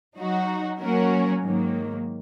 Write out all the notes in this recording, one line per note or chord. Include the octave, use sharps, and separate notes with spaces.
F#3 D#4 F#4
F#3 A#3 C#4 F#4 A#4
G#2 D#3 F#3 A#3